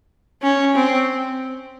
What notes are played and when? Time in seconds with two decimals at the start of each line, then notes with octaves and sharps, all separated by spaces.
0.43 C#4
0.75 C4